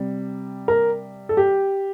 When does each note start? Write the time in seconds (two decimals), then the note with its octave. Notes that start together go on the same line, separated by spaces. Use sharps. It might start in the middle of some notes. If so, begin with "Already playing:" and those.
Already playing: C3 G3
0.68 A#4
1.29 A4
1.37 G4